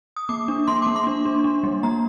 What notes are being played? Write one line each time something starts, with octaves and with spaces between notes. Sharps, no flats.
D#6
A#3 D6
D4
A#3 C6
A#3 D6
C6
D4
D4
D4
G3
A#3 A#5